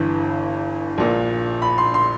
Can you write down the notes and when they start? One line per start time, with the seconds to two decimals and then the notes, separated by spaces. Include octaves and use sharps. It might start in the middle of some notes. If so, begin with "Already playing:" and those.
Already playing: G1 G2 E3
0.98 A#1 A#2
1.62 B5
1.78 C6
1.94 C6